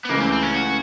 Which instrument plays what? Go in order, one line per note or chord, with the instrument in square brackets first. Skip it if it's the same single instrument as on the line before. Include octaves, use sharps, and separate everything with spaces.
[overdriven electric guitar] B3
[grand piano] C#2 C#3 E3 A3 [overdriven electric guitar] A#3
[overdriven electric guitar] C4
C4
C#4
F#4